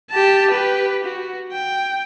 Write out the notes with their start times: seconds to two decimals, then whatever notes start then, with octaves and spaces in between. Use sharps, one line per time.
0.11 G4 A5
0.51 G4 B4
1.04 F#4
1.52 G5